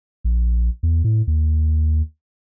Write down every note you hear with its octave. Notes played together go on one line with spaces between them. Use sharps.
A#1
E2
A2
D#2